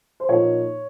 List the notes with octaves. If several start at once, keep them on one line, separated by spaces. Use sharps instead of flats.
C5
A#2 F3 A#3 D#4 C#5